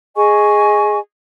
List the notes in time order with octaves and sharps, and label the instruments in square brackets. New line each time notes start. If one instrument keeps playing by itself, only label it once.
[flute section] G#4 D#5 G#5 C#6